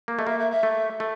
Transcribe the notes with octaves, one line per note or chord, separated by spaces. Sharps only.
A#3
A3 D#5
A#3 E5
E5
E5
A3
A3